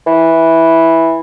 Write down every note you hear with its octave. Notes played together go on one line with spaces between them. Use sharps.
E3